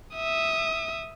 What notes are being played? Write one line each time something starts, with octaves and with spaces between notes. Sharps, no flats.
E5 D#6